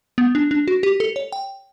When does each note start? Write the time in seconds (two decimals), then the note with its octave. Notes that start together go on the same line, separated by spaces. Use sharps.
0.18 B3
0.35 D4
0.51 D4
0.68 F#4
0.83 G4
1.00 A4
1.16 C#5
1.32 G5